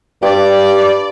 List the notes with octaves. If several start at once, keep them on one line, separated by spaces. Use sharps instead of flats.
G2 G4 D5